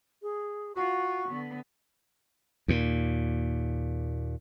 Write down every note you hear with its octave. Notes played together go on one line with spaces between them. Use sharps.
G#4
F4 F#4 C#6
D3 B3
D#2 A#2